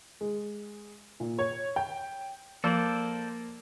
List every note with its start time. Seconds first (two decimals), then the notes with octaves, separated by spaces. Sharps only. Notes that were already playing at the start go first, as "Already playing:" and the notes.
0.21 G#3
1.20 A#2
1.38 C#5
1.76 G5
2.64 F3 A#3 A4 C5 D5